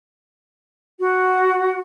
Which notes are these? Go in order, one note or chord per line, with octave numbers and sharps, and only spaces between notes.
F#4